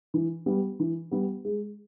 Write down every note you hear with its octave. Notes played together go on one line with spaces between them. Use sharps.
E3
G3 B3
E3
G3 B3
G#3